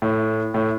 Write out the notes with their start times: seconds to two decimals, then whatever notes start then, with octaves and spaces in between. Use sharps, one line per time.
0.02 A2
0.54 A2